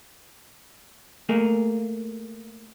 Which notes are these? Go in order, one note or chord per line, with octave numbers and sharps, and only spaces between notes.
A3 A#3 G#4